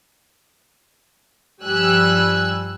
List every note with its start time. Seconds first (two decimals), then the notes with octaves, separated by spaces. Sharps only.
1.62 G2 F3 G3 G#5 E6 F#6